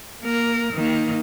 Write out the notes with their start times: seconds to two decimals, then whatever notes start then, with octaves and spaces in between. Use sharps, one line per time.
0.21 A#3 A#4
0.72 D#3 A#3